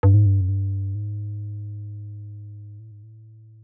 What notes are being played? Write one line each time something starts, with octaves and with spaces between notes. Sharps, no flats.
G2
G#2
G2
F#2
G2
G#2
A2
G#2
A2